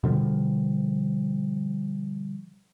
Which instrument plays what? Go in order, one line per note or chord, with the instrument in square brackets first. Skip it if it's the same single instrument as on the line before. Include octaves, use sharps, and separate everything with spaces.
[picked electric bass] B2 D3 F3 G3